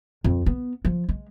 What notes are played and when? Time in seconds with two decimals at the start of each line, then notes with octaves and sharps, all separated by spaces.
0.24 F2
0.46 B3
0.85 F3
1.09 G#3